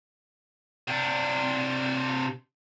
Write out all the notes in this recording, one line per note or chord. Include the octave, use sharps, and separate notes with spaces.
C3 D4